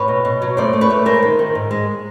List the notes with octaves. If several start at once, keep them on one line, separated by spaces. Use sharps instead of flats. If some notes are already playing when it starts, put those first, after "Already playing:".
Already playing: A2 B4 C#5
B2
B2
F#3
A3 C5 D5
A3
B4 C#5
A3
G#3 A#4 C5
D#3
D#3
G#2
G#3